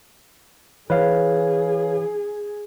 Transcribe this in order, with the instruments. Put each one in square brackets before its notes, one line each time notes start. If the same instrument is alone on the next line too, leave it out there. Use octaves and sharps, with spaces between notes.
[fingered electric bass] E3 [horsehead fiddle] G#4 [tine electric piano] B4 C#5 F5